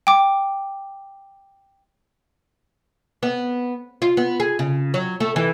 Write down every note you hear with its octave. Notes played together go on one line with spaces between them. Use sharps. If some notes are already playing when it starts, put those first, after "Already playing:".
G5 D6
B3
F4
B3
G#4
C#3
F#3
A3
E3